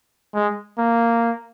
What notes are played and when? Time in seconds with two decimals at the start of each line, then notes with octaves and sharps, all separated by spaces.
0.34 G#3
0.78 A#3